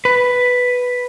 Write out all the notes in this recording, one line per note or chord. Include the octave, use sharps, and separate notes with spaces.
B4